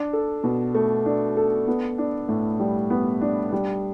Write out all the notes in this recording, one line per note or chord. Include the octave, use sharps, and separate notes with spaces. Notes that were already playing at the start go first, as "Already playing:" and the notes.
Already playing: D4
A4
B2
A3
D4
A4
B3
D4
A2
G3
B3
D4
G3